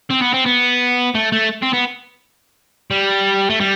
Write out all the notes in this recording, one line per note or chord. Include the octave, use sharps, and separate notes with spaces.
C4
B3
C4
B3
A3
A3
C4
B3
G3
A3
G3